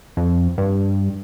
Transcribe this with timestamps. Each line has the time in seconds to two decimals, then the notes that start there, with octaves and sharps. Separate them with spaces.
0.17 F2
0.58 G2